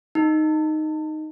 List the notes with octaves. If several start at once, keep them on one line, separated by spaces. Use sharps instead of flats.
D#4